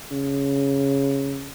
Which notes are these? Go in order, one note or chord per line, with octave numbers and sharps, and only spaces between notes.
C#3